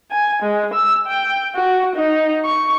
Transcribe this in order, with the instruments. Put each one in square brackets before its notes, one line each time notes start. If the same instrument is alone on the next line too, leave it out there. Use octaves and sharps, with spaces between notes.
[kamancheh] G#5
G#3
E6
G5
F#4
D#4
C#6